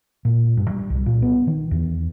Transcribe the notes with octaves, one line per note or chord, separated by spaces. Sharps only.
A#2
G2
G3
C2
A#2
B3
D#3
E2